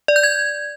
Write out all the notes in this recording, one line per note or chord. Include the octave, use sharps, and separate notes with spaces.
D5
G6
G#6